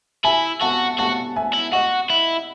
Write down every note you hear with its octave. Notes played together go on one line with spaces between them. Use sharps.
E4 E5 G#5
F#4 F#5 A5
F#4 F#5 A5
E5 G#5
E4
F#4 D#5 F#5
E4